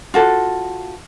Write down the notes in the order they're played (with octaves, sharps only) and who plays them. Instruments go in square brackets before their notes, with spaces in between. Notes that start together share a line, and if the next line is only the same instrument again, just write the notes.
[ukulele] F4 F#4 A4